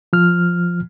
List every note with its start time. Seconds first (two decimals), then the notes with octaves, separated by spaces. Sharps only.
0.13 F3 F6